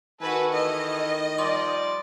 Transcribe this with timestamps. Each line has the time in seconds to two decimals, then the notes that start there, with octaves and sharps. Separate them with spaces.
0.21 D#3 F#4 A4 B4 G#5
0.54 E3 A3 D#5
1.38 F3 G3 D5 C6